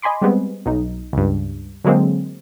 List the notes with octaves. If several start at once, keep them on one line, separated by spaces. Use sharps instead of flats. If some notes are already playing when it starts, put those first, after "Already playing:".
D#5 G#5 B5 C6 D6
G3 G#3 B3 C4
B1 D#4
C#2 G2
D3 F#3 G#3 A#3 C4